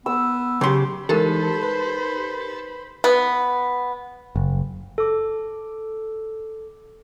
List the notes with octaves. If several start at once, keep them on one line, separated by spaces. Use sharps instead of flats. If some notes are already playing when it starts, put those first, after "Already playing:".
B3 E6
C#3 F#3 G4 C6 D6
E3 G#3 D#4 G4 A4 A#4 C5 B5
B4
B3
F#1
A4 D6